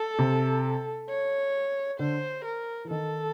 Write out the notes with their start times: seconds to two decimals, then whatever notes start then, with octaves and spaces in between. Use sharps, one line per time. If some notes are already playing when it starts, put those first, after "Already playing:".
Already playing: A4
0.19 C3
1.09 C#5
1.99 D3 C5
2.45 A#4
2.85 E3
2.90 D#3 A4